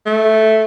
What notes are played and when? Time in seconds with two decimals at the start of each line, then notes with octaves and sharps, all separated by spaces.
0.06 A3